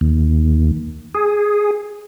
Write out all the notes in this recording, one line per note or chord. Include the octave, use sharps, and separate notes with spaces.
D#2
G#4